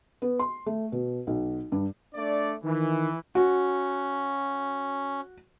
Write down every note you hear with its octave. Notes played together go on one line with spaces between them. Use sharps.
B3
C6
A3
B2
B1
G2
A3 D4 D5
D#3 E3
C#4 F#4